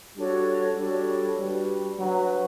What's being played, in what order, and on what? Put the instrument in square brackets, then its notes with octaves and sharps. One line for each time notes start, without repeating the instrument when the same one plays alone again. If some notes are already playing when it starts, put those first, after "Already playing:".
[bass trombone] G3 [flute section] D4 F#4 A4 C#5
[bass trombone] G3 [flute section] D4 F#4 A4 C#5
[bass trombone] G3 [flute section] D4 F#4 B4
[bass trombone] F#3 [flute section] D4 F#4 B4